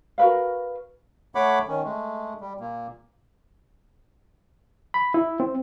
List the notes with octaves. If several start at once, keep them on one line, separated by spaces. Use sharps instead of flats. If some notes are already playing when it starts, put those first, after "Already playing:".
F#4 A#4 B4 F5
A3 C#5 F#5 B5 D6
D#3 C#4
G#3 A3
G3
A#2 A#3
B5
E4
C4